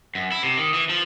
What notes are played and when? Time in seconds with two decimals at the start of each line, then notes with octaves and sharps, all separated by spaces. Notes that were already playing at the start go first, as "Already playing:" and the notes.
0.15 F#2
0.32 E4
0.43 C3
0.57 D#3
0.74 E3
0.89 F3